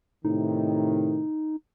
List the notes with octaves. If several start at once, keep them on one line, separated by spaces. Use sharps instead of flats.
A2 C3 D#3 D#4